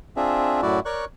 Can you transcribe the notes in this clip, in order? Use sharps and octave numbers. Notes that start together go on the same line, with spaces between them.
C4 D4 F4 G#4 E5
F#2 A2 E4 F#4 D5
A#4 C#5 D5 C#6 F#6